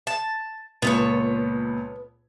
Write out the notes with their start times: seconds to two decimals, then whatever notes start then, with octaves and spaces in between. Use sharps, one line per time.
0.07 A5
0.82 C#2 A#2 B3 A4 C#5